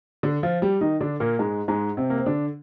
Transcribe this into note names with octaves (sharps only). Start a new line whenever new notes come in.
D3 D4
F3 F4
G3 G4
D#3 D#4
D3 D4
A#2 A#3
G#2 G#3
G#2 G#3
C3 C4
A#3
C4
D3 D4